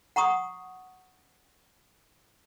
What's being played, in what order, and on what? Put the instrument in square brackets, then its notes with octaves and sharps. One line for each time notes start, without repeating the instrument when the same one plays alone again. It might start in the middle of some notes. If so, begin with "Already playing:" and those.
[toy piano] F#5 A#5 C#6 D#6